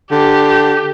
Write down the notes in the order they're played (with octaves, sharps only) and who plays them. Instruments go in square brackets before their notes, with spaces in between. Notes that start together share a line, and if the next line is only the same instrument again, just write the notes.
[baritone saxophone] D3 [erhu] G4